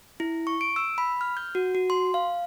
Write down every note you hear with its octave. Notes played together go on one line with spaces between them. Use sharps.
E4
C#6
D7
E6
B5
F6
G6
F#4
F#4
C6
F5